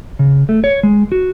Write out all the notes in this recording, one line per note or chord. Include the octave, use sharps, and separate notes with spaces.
C#3
A3
C#5
G#3
F#4